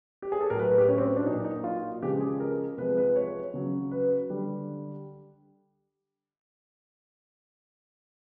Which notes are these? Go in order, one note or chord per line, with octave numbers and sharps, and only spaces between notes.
G4
G#4
A4
A2 F#3 A#4
B4
B4
G4
C#4
C4
C#4
D4
A#2 F#3 D#4
D#4
F4
C#3 F3 G#3 G4
G#4
A#4
C3 F3 G#3 B4
B4
C#5
C#3 F#3
B4
D3 G3